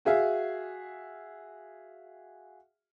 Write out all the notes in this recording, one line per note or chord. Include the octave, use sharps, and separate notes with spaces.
F#4 G#4 E5 F5